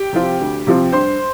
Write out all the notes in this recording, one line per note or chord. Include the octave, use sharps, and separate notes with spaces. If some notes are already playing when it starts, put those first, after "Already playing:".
Already playing: G4 G5
C3 F3 C4 F4
D2
C3 F3 C4 F4
G2 C5 C6